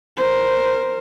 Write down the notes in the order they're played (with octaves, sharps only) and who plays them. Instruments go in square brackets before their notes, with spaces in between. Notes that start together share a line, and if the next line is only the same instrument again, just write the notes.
[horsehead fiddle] A#4 C5